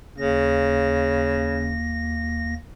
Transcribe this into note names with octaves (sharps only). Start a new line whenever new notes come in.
D#2 C#3 A#3 A#6